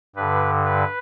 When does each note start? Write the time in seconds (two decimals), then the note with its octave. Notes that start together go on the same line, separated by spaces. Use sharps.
0.16 G2 D3 B4
0.65 B4